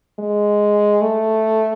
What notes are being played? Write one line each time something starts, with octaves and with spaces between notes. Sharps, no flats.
G#3
A3